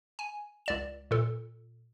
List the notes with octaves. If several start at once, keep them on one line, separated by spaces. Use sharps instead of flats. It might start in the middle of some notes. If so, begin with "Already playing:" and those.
G#5
C#2 D5 E7
A#2 A4